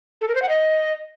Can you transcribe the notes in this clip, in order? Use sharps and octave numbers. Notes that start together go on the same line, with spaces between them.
A4
A#4
C5
F#5
D#5